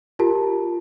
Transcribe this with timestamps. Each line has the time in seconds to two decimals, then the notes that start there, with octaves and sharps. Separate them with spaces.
0.19 F4 G4 A#4 A5